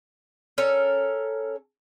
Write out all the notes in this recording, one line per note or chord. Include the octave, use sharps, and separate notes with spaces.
C#4 A4 A#4